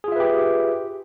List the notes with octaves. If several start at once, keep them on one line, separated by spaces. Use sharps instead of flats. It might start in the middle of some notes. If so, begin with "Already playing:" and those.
F4 G4 G#4 B4 E5